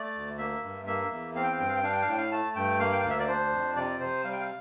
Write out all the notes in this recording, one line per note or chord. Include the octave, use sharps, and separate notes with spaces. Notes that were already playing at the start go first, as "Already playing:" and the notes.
Already playing: A3 D5
D2
A#3 E5
G2
A#3 E5
E2
C4 F5
G5
F5
G2 G5
F5
G5
D4 F5
G5
F5
A2 G5
F5
A3 A5
G2 G5
A#3 F5
G5
D2 F5
E5
D5
D4 C5
F2
C3 D5
C3 C5
G3 F5
G5
F5